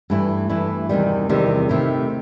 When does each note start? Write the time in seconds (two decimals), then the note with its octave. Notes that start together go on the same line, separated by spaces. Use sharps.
0.10 G2 E3 A3 E4
0.49 G2 E3 A3 E4
0.89 E2 C3 D#3 G3
1.29 E2 C3 D#3 G3
1.69 C3 D#3 A3 E4